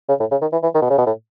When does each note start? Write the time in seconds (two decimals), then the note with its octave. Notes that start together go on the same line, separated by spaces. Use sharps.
0.08 C#3
0.20 A2
0.31 C#3
0.41 D#3
0.52 E3
0.63 E3
0.74 D#3
0.82 B2
0.90 C#3
0.98 B2
1.06 A2